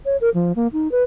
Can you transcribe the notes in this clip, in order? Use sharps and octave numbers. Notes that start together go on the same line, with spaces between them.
C#5
A#4
F3
A#3
D#4
B4